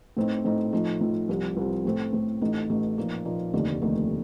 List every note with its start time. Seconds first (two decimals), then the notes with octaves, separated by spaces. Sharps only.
0.17 A2 A3 C4 D#4
0.45 A2 A3 C4 D#4
0.73 A2 F3 A3 D#4
1.01 A2 F3 A3 D#4
1.28 C2 C3 F3
1.57 C2 C3 F3
1.85 A2 A3 C4
2.13 A2 A3 C4
2.42 A1 A2 A3 D#4
2.69 A1 A2 A3 D#4
2.98 A#2 F3 A#3 D#4
3.25 A#2 F3 A#3 D#4
3.53 F1 D#2 D3 A3 D#4
3.82 F1 D#2 D3 A3 D#4